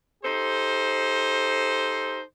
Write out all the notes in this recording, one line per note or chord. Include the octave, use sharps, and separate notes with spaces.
D#4 G4 A4 C5